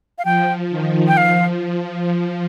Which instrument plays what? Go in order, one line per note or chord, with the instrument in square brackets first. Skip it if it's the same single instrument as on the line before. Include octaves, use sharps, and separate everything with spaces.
[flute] F5
[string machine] F3 [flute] G5
[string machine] D#3
[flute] G5
[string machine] F3 [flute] F5